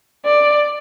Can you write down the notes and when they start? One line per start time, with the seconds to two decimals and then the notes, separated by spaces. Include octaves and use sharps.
0.26 D5